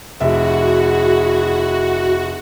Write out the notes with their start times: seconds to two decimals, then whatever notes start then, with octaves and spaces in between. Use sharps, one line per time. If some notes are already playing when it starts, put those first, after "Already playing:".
0.20 F1 E4 F#4 G#4 E5